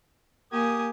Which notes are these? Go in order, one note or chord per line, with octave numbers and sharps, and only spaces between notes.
A#3 G4 G#5 D#6